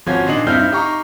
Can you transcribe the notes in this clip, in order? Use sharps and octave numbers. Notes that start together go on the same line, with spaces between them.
G#1 F3 C#4 F4 F#4 G#6
A#2 D#3 D4 D#5 C7 F#7
G2 C4 D#4 E4 F6 G6
D#4 G4 F5 A#5 C#6